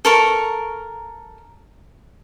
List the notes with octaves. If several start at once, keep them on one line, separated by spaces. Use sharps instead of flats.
A4 A#4 C#6